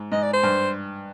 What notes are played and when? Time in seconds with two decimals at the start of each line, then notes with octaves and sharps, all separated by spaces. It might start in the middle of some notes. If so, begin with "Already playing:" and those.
Already playing: G#2
0.12 G#2 D#5
0.22 D5
0.33 C5
0.43 G2